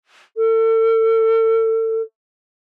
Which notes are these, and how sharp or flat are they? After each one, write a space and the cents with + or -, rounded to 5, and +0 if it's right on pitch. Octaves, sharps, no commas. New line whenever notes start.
A4 +35